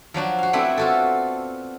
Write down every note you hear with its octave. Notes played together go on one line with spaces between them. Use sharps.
F3 F#3 D4 F#4
F#4 F5
A3 B3 C4 D4 E4 F#4
F4 F#4 A4